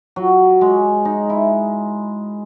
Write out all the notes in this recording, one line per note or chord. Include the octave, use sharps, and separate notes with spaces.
F#3
G#3
D#4
E4